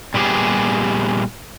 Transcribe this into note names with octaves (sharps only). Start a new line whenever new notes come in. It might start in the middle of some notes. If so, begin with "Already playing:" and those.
A#2 G3 B3 G4 G#4